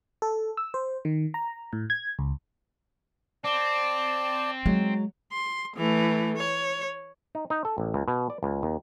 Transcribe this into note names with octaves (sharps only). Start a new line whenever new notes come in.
A4
E6
C5
D#3
A#5
A2
G#6
C#2
C4 D5 A5
F#3 G#3
C6
E3 A3
C#5
D#4
D#4
A4
A1
C#2
B2
D5
C#2
D#2